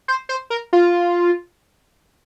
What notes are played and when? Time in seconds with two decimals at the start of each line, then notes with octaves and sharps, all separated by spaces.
0.08 C5
0.29 C5
0.50 A#4
0.73 F4